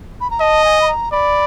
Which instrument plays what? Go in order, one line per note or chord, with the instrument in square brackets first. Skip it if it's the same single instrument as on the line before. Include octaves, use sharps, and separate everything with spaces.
[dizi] B5
A#5
[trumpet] D#5 [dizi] A5
[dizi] G#5
B5
A#5
[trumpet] D5 [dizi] B5